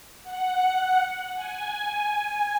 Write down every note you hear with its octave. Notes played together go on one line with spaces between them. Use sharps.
F#5
G#5